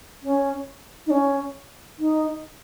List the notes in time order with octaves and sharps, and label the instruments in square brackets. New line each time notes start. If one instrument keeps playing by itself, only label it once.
[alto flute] C#4
D#4
C#4
D#4